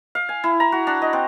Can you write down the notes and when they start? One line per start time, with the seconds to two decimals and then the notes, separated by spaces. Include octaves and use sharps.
0.15 F5
0.29 G#5
0.44 E4
0.60 A#5
0.72 F#4
0.87 D4
1.02 D#5
1.13 C4